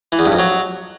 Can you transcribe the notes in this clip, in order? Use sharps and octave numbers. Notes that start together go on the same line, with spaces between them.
E3
E2
G2
F2
F#3